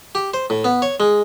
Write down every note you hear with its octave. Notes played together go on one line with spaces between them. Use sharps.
G4
C5
A2
B3
C#5
G#3